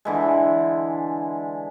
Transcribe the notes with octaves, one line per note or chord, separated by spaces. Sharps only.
D3 E3 G#3